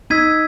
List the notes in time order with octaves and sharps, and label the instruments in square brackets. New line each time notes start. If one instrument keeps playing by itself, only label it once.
[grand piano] D#4 [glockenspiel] E6 G#6 B6 D#7